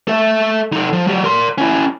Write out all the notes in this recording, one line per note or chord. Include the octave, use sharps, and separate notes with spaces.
A4 E5
D#4 A4
F3
F#3 G4
A#4 C6
C#4 E4